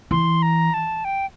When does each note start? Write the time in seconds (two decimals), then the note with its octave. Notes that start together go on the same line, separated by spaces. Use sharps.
0.11 E3 C6
0.42 A#5
0.74 A5
1.04 G5